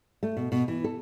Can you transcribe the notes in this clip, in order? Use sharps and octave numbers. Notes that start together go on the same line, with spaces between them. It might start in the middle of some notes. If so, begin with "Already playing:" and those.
A3
B2
B2
E3
A4